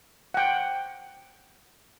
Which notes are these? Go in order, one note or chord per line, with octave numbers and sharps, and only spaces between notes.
F#5 G5